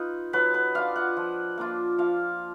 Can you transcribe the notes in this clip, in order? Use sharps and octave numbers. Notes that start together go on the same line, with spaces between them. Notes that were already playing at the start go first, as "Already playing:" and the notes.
Already playing: D#4 F4 B4
F#3 B4
B4
D4 F4 F5
F#5
F3
A#3 D4 F4
F3 F5